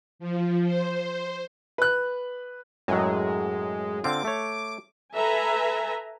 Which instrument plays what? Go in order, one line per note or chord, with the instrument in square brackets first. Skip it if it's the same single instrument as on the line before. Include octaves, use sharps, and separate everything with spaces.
[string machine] F3
C5
[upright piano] B4 F#6
[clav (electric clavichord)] F#2 A2 F#3 [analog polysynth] G#3
[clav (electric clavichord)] D3 C4 F4 [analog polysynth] D6
[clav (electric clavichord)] A3 C#5
[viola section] A4 B4 E5 G#5 A#5